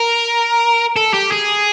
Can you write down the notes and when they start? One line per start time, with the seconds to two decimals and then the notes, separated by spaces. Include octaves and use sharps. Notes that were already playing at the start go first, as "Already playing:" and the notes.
Already playing: A#4
0.96 A4
1.14 G4
1.32 G#4